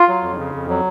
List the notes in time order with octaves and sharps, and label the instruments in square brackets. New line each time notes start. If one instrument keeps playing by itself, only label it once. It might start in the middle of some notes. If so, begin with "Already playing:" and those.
Already playing: [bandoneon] F4
F#3
F2
C#3
F2
F#3